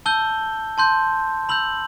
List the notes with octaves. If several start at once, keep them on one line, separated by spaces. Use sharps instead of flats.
A5 E6 G6 G7
A5 C6 G6
B5 E6 G6 F#7